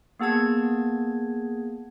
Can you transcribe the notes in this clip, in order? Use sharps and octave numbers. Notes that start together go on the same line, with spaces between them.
A#3 B3 G#4 A5 G#6